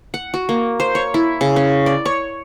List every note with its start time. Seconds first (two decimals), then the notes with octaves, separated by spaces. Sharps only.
0.14 F#5
0.34 F#4
0.49 A#3
0.80 C5
0.95 C#5
1.14 E4
1.41 C#3
1.56 C#4
1.86 D5
2.06 C#5